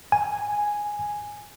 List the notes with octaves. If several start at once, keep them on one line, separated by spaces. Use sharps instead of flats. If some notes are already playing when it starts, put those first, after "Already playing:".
G#5